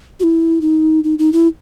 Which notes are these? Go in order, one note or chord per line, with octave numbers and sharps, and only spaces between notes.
F#4
E4
D#4
D#4
D#4
E4